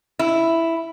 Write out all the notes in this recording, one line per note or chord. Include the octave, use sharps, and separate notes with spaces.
E4